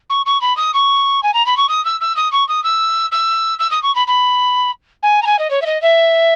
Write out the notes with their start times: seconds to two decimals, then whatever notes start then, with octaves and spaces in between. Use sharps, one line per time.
0.09 C#6
0.26 C#6
0.41 B5
0.57 D#6
0.73 C#6
1.23 G#5
1.33 A#5
1.46 B5
1.57 C#6
1.69 D#6
1.85 E6
2.00 E6
2.16 D#6
2.32 C#6
2.48 D#6
2.63 E6
3.11 E6
3.59 E6
3.71 D#6
3.82 C#6
3.95 B5
4.07 B5
5.02 G#5
5.22 A#5
5.26 G#5
5.38 D#5
5.50 C#5
5.61 E5
5.66 D#5
5.82 E5